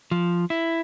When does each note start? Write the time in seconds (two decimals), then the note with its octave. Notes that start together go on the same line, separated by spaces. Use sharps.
0.11 F3
0.50 E4